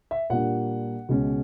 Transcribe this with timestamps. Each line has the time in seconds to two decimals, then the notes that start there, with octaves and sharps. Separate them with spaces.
0.11 E5
0.30 A#2 G3 A#3 D4 F#5
1.09 C#2 B2 G#3 C#4